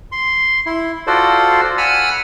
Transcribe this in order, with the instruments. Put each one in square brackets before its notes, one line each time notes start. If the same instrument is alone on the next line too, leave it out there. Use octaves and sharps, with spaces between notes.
[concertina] C6
E4
F4 F#4 A4 C5 D5
F#5 G#5 B5 E6 F6